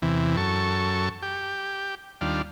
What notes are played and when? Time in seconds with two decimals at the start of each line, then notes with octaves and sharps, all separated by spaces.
0.02 E2 C3 E3
0.37 F#2 A4 C#6
1.22 G4
2.21 D#2 G3 D4 F4